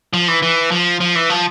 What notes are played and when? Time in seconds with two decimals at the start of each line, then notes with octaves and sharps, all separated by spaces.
0.13 F3
0.28 E3
0.42 E3
0.71 F3
1.00 F3
1.15 E3
1.30 F3